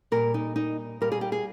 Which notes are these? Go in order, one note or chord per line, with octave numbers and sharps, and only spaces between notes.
A#2 G3 A#4
D#4
D#4
A#2 G3 A#4
G#4
G4
G#4